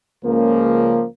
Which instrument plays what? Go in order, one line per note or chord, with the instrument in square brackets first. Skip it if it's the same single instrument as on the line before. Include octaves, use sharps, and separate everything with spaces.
[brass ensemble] C#2 C#3 F3 A#3